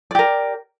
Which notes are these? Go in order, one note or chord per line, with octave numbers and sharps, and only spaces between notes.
G4 A#4 D5